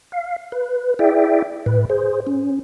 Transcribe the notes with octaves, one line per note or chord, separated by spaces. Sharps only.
F5
B4
E4 G#4 D5 E5 G5
A2 B4
G#4 C5
C#4